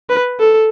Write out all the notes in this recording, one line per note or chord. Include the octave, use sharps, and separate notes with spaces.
B4
A4